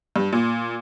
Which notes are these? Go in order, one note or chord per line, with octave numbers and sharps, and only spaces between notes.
G2
A#2